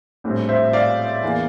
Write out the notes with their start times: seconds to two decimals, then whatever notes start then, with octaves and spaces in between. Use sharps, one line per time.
0.24 A#1 A2 G3 C4
0.49 C5 E5
0.73 D5 F5
1.23 E2 E3 A#3